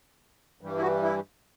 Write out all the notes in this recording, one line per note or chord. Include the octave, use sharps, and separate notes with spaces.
G2 E3 G3
E4
F#4
E4